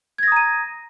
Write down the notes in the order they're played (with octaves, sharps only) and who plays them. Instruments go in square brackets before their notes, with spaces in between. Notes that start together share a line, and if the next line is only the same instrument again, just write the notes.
[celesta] G#6
A#6
D#6
A#5
D#7